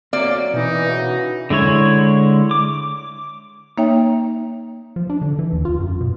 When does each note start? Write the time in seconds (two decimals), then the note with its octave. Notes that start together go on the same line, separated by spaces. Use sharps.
0.13 A#3 C4 F#4 C#5 D5
0.53 B2 E3 D#4
0.86 C#3 E3 F#4
1.50 D3 G#3 E4 C#5
2.51 D6
3.78 A#3 D#4 C#5 E5 G5
4.96 F3
5.09 D4
5.22 D3
5.39 E3
5.53 D#2
5.65 F4
5.80 F#2
6.01 B2